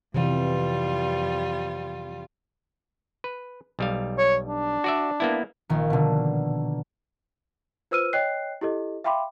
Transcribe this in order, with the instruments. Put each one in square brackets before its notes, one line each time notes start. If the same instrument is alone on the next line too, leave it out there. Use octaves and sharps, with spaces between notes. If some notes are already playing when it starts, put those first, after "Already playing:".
[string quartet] F2 G3 F4 [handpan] C3 E3
[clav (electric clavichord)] B4
B1 G3 F5
[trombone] C#5
D4
[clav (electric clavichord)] F#4 D5 E5
A#3 B3 E4
[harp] A#1 D#3
B2 D3
[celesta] F4 B4 C5 E6 F6 D#7
C#5 D#5 G5 F#6 C7
E4 G4 A4 D#5
E5 F5 G5 B5 C6 D6